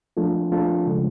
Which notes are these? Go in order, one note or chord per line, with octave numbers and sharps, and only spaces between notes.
F3 A3 D4 F4 A4
F3 A3 D4 F4 A4
C#3 F3 G#3